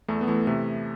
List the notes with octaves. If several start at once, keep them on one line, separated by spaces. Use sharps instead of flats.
E2 A3
B3
E3 A3
C3 A3